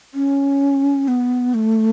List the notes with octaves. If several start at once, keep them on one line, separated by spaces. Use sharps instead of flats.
C#4
B3
A3